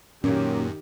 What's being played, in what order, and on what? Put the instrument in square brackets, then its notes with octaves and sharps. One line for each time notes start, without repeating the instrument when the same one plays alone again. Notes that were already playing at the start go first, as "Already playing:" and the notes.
[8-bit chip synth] F#2 [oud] A#2 F#3 A#3 [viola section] D#3 G4 [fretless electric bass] C#4